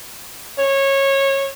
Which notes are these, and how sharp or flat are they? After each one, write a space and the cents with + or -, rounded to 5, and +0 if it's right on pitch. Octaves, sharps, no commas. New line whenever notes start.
C#5 -20